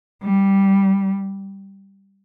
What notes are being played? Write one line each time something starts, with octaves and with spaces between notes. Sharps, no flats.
G3